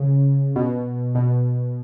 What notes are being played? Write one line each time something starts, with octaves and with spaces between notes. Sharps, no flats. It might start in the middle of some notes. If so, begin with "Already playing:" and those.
Already playing: C#3
B2
B2